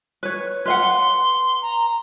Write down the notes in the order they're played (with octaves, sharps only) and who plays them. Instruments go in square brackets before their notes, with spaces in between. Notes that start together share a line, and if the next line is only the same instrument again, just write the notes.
[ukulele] B4 C#5
[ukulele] B4 F5 F#5 [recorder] C6
[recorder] A#5